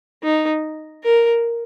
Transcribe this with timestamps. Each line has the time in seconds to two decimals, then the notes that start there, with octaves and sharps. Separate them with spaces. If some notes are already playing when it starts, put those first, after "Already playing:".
0.23 D#4
1.04 A#4